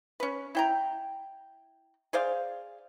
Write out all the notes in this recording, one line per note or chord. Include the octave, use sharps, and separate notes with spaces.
C#4 B4
E4 G5 A#5
G#4 C5 D5 F5